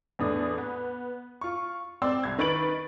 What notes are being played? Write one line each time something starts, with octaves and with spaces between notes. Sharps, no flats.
E2 A2 D4 D#6
B3
F4 C#6
C4 D5 C6 E6
C2 G#6
D#3 B4 C#6 A6 D7 F#7